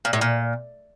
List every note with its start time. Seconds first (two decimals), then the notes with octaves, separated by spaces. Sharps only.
0.05 A#2
0.13 A2
0.21 A#2